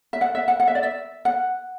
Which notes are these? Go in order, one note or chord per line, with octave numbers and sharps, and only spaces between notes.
E5
F#5
E5
F#5
F#5
E5
D5
E5
F#5